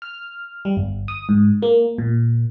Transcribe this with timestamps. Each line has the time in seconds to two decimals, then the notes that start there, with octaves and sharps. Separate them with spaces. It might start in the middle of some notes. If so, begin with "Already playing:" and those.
0.02 F6
0.65 G3
0.77 G1
1.08 D#6
1.29 G#2
1.62 A#3
1.98 A#2